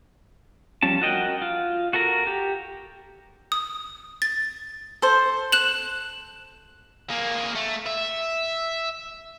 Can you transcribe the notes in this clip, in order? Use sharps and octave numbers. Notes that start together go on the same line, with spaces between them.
F3 G3 C#4 A5
F#4 A#4 D#5 F#5 G5
F4
F#4 A4 A#4 A#5
G4
D#6
A6
A4 C5
F#6 E7 F#7
A#3 G#4
A3
E5